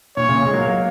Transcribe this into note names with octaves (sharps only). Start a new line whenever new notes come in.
A#2 C#5
A#2 C#3
G#3
F#3 A#3
F#3 A#3